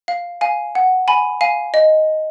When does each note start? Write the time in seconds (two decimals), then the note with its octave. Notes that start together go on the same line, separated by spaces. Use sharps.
0.08 F5
0.41 F5 G#5
0.75 F#5
1.08 G#5 B5
1.41 F5 G#5
1.74 D#5